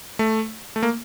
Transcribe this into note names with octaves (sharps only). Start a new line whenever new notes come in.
A3
A3
A#3